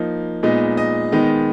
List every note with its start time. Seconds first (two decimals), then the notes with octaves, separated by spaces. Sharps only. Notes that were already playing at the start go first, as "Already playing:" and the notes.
Already playing: F3 A#3 D#4
0.43 A#2 G#3 B3 D#4
0.77 D#5
1.12 D#3 G#3 B3 D#4